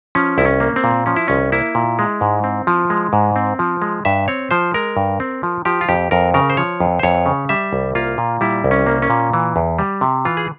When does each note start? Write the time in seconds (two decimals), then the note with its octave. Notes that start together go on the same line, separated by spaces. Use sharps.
0.15 F3 C#4
0.38 C2 E4
0.45 C#4
0.60 A#3
0.76 C4
0.84 A#2
1.06 F3 C#4
1.16 E4
1.28 C2 C#4
1.52 A#3 E4
1.75 A#2
1.99 G#3
2.21 G#2
2.44 C4
2.67 F3
2.90 G#3
3.13 G#2
3.36 C4
3.59 F3
3.82 G#3
4.05 G2 E5
4.28 C4 C#5
4.51 F3 C5
4.74 G#3 A#4
4.97 G2
5.20 C4
5.43 F3
5.65 F3 G4
5.81 F4
5.89 F2 G4
6.11 F2 A#4
6.34 C#3 A#4
6.50 C5
6.57 F3 C#5
6.80 F2
6.99 C5
7.03 F2 C#5
7.26 C#3
7.49 G3 E5
7.73 C2
7.95 A#3 F4
8.18 A#2
8.41 G3 E4
8.64 C2
8.71 C#4
8.86 A#3
9.02 C#4
9.10 A#2
9.33 E3
9.56 E2
9.79 G3
10.01 C3
10.25 E3 F4
10.37 G#4